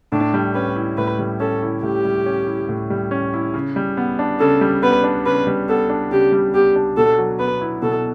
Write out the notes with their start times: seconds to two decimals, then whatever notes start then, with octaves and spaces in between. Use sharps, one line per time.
0.12 A2 D4
0.34 G3
0.55 C#4 B4
0.76 E4
0.98 A2 B4
1.19 G3
1.40 C#4 A4
1.62 E4
1.83 A2 G4
2.05 G3
2.26 C#4
2.47 E4
2.69 A2
2.90 G3
3.11 C#4
3.34 E4
3.54 C#3
3.76 G3
3.97 B3
4.19 D4
4.40 C#3 A4
4.61 G3
4.83 B3 B4
5.04 D4
5.26 C#3 B4
5.47 G3
5.69 B3 A4
5.90 D4
6.11 C#3 G4
6.32 G3
6.54 B3 G4
6.76 D4
6.97 B2 A4
7.18 F#3
7.39 B3 B4
7.61 E4
7.82 B2 A4